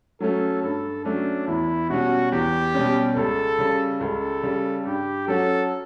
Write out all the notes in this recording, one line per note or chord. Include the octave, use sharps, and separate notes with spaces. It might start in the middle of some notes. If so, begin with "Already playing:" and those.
F#3 A3 C#4 A4
G2 A4
F#3 A3 C#4 D4
E2 E4
B2 G3 C#4 F#4
E2 G4
B2 G3 C#4
C#2 A4
C#3 G3
C#2 A4
C#3 G3
G2 G4
F#3 C#4 F#4 A4